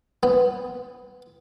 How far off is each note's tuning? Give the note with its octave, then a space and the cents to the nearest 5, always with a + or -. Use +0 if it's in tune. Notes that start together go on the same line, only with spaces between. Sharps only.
B3 +10